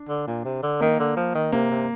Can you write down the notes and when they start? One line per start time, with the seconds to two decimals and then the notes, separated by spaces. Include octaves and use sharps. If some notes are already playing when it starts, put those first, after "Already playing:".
Already playing: D4
0.09 D3
0.27 A#2
0.45 C3
0.63 D3
0.81 D#3 A#3
0.99 D3
1.17 F3
1.35 D#3
1.52 C3 A#3
1.71 C3